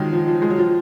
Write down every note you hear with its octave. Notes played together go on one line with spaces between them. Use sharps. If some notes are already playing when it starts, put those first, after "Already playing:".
Already playing: D#3 F3 F#3 G#3
F3
F3
G#3
F#3
F3